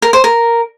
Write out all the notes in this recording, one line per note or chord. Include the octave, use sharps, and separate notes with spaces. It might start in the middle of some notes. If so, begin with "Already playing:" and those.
A#4
C5
A#4